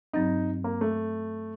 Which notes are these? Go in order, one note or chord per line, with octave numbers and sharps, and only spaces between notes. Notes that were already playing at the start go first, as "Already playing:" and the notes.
G2 F#3 C4 D#4
A#3
A3